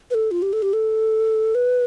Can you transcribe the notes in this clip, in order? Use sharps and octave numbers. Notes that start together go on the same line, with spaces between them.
B4
A4
F4
G4
A4
G4
A4
B4